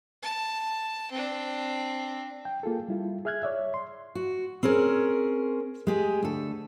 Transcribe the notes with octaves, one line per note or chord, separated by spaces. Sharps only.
A5
C4 D4
G5
A#3 F4 G#4 A4
G3 E4 F4
G#4 E5 F6 F#6 G#6
C#5 D5 E5
C6
F#4
C4 C#4 G#4 A#4
G#3 G4 G#4
D2 A4